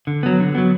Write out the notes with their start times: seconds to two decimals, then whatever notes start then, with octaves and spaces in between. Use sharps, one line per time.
0.07 D3
0.23 F#3 B3
0.40 D3
0.55 F#3 B3